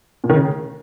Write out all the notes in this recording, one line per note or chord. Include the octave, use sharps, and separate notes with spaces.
A#2
D#3
C#3